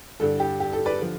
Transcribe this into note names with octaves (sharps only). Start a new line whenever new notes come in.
G2 D3 G3 D4 A4
G4
G4
A4
B4 D5
D3 F3